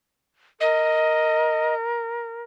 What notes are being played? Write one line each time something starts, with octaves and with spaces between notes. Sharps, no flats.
A#4 D#5